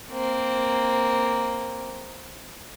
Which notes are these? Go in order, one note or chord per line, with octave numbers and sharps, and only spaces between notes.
A#3 C4